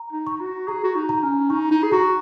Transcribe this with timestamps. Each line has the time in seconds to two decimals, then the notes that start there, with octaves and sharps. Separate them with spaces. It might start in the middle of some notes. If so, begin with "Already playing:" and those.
Already playing: A#5
0.12 D#4
0.27 C#6
0.41 F#4
0.67 G#4 A#5
0.84 F#4
0.96 D#4
1.09 A#5
1.22 C#4
1.50 D#4 C#6
1.71 D#4
1.83 G#4
1.92 F#4 A#5